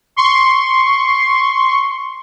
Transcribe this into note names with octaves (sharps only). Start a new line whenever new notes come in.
C6 C#6